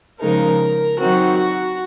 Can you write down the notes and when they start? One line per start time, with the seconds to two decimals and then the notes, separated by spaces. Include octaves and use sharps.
0.21 C#3 F3 G#3 D#4 A#4
1.00 D#3 F#3 C4 D#4 F#4
1.39 F#4